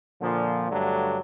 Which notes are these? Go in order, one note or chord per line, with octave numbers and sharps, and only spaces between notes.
A#2 D3 F3
G2 D3 F#3 A3 D4